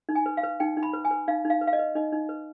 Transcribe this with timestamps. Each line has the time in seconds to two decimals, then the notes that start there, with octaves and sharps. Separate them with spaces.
0.09 D#4
0.15 G#5
0.26 B4
0.37 F5
0.43 B4
0.60 D#4 G5
0.77 D#4
0.83 B5
0.93 B4
1.05 G#5
1.11 B4
1.28 D#4 F5
1.45 D#4
1.50 F5
1.61 B4
1.67 F5
1.73 D#5
1.79 B4
1.95 D#4 D#5
2.12 D#4
2.29 B4